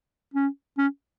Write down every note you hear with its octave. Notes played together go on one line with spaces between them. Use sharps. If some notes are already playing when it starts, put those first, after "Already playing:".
C#4
C#4